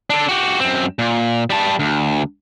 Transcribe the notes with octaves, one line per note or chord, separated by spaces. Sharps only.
D4 A4
F#4 G4
F#2 C4
A#2
G3 A5
D2